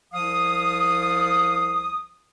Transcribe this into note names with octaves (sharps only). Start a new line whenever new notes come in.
C2 F3 F5 D#6